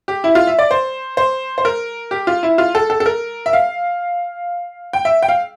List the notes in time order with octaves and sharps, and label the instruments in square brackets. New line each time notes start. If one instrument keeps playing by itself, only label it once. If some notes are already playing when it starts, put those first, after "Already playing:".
[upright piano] G4
E4
F4
E5
D5
C5
C5
C5
A#4
G4
F4
E4
F4
A4
A4
A4
A#4
E5
F5
G5
E5
G5
F5